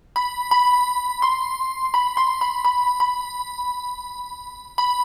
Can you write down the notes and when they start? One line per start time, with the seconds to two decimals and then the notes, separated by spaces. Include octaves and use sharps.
0.16 B5
0.51 B5
1.22 C6
1.94 B5
2.17 C6
2.41 B5
2.65 B5
3.00 B5
4.78 B5